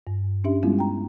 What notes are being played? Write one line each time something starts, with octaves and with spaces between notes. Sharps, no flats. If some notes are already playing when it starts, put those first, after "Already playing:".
G2
C#4 D4 G4 E5
G3 G#3 B3 C#4 E4 F4
G5 A#5